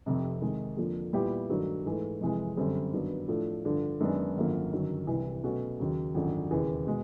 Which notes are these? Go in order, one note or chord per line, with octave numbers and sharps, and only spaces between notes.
F1 F2 C3
C3 D#3 G#3
F2 D3 F3 A#3
A#2 G3 B3 E4 G4
G2 D#3 F#3 A3
G#2 E3 A3
F2 C3 E3 G#3
G1 F#2 D3 G3 C4
G2 D#3 F#3 B3
A2 F3 A3 D4
G2 D3 F3
F#2 D#3 G#3 B3 D4
G#1 F#2 D3 F3 A#3
G1 F#2 D#3 F#3
C2 C3 E3
B2 F#3 A3 C#4 F#4
D#2 C#3 F#3
G#1 F#2 D3 F3
E1 D#2 C#3 E3
B2 G#3